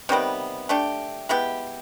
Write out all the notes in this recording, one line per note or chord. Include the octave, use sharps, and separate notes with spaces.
C3 D#3 G3 B3
A3 D4 G4
G#3 B3 E4 G4